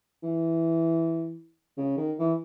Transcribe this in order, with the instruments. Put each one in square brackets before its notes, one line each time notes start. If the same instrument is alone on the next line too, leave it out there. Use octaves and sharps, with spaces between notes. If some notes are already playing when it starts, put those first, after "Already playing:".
[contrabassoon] E3
C#3
D#3
E3